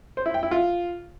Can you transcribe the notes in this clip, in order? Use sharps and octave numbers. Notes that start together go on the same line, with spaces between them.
C5
E4
G5
E4
F4